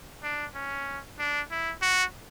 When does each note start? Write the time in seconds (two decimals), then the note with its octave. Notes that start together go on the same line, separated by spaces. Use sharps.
0.23 D4
0.55 C#4
1.19 D4
1.51 E4
1.82 F#4